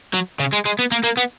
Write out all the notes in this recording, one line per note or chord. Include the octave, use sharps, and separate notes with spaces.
F#3
C#3
G#3
G#3
B3
A#3
A#3
B3